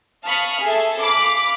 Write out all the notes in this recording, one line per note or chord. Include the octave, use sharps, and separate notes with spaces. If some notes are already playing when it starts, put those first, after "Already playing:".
F5 A5 B5 C#6 D#6 F6
G#4 A4 E5
F5 B5 D6